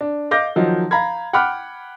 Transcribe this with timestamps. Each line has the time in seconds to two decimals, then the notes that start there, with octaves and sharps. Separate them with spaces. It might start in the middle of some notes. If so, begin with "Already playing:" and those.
0.01 D4
0.31 D#5 F5 D6 G6 A#6
0.56 D#3 F3 F#3 D#4
0.91 F5 A#5 B5 G#6
1.33 F#5 G5 B5 D6 F6 F#6